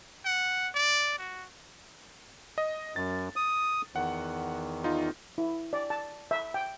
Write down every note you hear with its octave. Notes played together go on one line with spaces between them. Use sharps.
F#5
D5
F#4
D#5
F#2 A6
D#6
E2 D#3 F#5
D#4 F4
E4
D5
A5
E5
G5